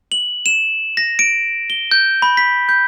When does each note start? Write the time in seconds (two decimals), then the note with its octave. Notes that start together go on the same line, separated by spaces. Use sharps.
0.12 F#7
0.46 E7
0.97 A#6
1.19 D7
1.70 G7
1.91 G6
2.22 B5
2.37 B6
2.69 G6